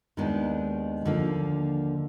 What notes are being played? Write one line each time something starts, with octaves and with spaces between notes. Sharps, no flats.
D#2 D#3 G#3 B3 D4
D#2 D3 F3 A#3